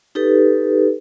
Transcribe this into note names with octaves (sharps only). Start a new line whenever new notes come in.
D#4 G4 A4 B4